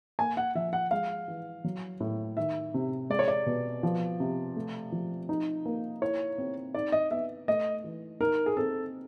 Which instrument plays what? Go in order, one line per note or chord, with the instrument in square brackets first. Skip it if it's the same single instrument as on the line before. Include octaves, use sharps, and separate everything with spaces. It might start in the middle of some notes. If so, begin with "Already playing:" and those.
[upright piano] A#3 [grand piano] G#5
[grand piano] F#5
[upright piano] F3 [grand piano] E5
[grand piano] F#5
[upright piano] G#3 [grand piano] F5
[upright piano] E3
F#3
A2
[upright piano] D#3 [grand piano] E5
[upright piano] C3
[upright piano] G#3 [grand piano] D5
[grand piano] C#5
D5
[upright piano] B2
F3
C3
A3
F3
D#4
A#3
[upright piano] E4 [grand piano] C#5
[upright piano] C4
[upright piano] D#4 [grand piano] D5
[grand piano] D#5
[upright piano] B3 [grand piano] E5
[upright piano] A3 [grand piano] D#5
[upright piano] E3
[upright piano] D#4 [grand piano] A#4
[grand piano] G#4
[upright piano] C4 [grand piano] A4